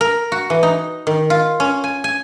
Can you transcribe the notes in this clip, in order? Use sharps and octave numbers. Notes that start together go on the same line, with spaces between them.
A#4
F#4
E3
D#4
D#3
F4
C#4
G#5
G#5